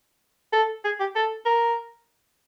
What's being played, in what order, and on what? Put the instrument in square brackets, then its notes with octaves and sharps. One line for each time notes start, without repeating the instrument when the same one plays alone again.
[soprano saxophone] A4
G#4
G4
A4
A#4